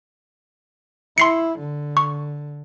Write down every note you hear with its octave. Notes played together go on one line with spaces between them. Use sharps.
E4 C6 C7 C#7
D3
C#6